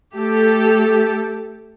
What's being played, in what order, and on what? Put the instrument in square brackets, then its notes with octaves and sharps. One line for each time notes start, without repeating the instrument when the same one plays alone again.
[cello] A3 [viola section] G4 A4